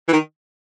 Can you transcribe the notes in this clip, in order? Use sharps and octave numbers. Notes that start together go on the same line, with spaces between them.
E3
D#3